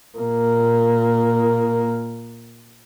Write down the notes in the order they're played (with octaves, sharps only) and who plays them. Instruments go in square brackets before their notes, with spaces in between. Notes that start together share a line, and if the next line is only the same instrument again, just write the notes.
[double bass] A#2 A#3